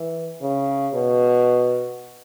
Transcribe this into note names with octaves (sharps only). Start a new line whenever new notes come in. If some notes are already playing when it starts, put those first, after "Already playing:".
Already playing: E3
C#3
B2